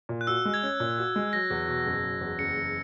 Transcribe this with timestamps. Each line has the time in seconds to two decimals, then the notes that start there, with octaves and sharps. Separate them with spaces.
0.09 A#2
0.21 F#6
0.27 F#4 E6
0.45 G#3
0.54 G#6
0.63 C#4
0.80 A#2
0.98 F#4
1.16 G#3
1.33 F#3 A#6
1.50 E2
1.68 B2
1.86 F#1
2.03 F#3
2.21 E2
2.39 F#1 C#7
2.57 E2